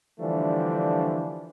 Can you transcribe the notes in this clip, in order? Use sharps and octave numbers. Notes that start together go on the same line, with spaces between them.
D3 E3 F3 G3 A3 D4